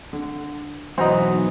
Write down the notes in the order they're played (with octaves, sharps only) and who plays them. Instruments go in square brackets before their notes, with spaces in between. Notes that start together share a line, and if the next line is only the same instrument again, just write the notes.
[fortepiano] D3
[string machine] B2 F#3 D#4 [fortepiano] E3 F#4 A#5 [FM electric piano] C5 D#5